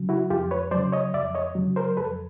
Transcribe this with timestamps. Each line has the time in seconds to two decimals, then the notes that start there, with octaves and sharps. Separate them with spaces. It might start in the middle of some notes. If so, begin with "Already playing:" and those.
Already playing: C#3 F#3
0.09 E4 F#4
0.30 F2 F4 G4
0.51 B4 C#5
0.71 F#3 C5 D5
0.76 C#3
0.92 C#5 D#5
1.14 F2 D5 E5
1.35 C#5 D#5
1.55 C#3 F#3
1.76 A#4 C5
1.97 F2 A4 B4